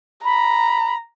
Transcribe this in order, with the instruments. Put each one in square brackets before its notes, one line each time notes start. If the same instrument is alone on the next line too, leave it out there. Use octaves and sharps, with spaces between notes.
[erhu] A#5 [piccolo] B5